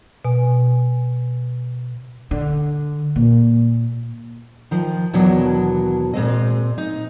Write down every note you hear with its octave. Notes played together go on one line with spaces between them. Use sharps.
B2 G#5
D3
A#2
D#3 F3
D#2 B2 E3 F#3 D4
A#2 G#3 C4 D#5
D#4